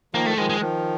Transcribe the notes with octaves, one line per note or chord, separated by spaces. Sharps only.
D#3 F3 A#3
A3
D#3 F3 G#3
G#3
D#3 F3